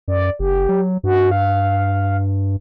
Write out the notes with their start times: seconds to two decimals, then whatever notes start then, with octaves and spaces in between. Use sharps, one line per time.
0.08 F#2 D5
0.39 F#1 G4
0.69 F#3
1.03 G2 F#4
1.31 F5